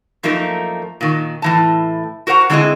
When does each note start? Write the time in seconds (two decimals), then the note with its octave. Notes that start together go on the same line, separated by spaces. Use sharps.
0.23 F#2 F3 A3 A#3 D#4 A#4
1.01 A#2 D#3
1.42 A2 E3 A5
2.27 F#4 A#4 C5 F#5 A#5
2.50 D3 G#3 C4 E4 G#4 D#5